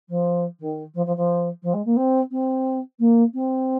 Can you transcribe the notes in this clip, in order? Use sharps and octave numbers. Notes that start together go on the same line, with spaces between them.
F3
D#3
F3
F3
F3
F3
G#3
A#3
C4
C4
A#3
C4